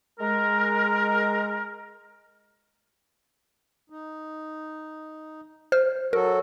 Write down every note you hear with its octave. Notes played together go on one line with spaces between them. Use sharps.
G#3 A#4
D#4
C5 F6
F#3 F#4 A4 A#4